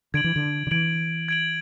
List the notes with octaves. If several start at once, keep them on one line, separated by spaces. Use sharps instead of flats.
D3 G#6 D7 F#7
E3
D3
D3
E3 G#6 D7 F#7
G#6 D7 F#7